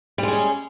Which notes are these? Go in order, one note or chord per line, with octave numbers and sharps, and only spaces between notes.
G3 G#3 C#4 G#4